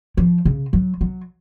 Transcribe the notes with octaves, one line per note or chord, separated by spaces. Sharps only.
F3
C#3
F#3
F#3